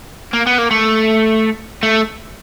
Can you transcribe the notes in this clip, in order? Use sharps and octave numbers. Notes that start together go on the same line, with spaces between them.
A#3
B3
A#3
A3
A3